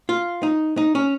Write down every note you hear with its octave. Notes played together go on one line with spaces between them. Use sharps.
F4
D#4
D#4
C#4